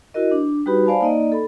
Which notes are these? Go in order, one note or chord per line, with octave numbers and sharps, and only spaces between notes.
E4 F#4 A#4 D#5
D4
G3 D#4 F#4 G4 B4 B5
C5 D5 F5 G#5 A5 B5
A#3 D#4 D5 D#5
A4 B5